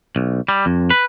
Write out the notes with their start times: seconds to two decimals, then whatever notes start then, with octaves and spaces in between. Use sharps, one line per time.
0.16 B1
0.49 G3
0.66 F2
0.90 B4